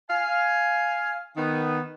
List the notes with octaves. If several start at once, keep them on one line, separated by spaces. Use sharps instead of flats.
F5 G#5
D#3 B3